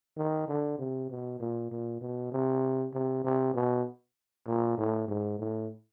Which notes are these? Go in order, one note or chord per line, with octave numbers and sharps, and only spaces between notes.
D#3
D3
C3
B2
A#2
A#2
B2
C3
C3
C3
B2
A#2
A2
G#2
A2